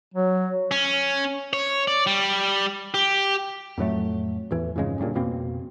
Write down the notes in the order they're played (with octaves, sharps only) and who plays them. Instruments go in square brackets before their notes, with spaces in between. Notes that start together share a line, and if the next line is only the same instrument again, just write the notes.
[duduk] F#3
[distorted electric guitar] C#4
C#5
D5
G3
G4
[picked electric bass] F2 A2 F#3 A3
A1 E2 E3
F2 G#2 C#3 G#3
D1 C#2 G2 A#2
F2 B2 A#3 C4